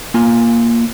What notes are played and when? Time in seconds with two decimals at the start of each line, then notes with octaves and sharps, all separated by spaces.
0.14 A#3 F4 G#5